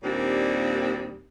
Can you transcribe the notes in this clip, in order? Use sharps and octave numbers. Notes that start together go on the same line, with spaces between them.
D#2 A#2 G3 C4 D4